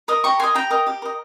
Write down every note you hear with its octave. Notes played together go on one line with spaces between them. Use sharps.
A#4 D#5
G4 A#5 C#6
A#4 D#5 G#5 C6
G4 G5 A#5
A#4 D#5
G4
A#4 D#5